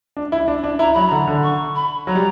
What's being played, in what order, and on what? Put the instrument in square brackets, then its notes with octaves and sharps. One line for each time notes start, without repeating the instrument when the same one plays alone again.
[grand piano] D4
E4
D4
D4
[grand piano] E4 [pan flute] A#5
[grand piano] F#3 [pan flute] B5
[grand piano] D3 [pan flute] A#5
[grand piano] D3
[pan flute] C#6
B5
[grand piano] F#3 [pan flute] A#5
[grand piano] G3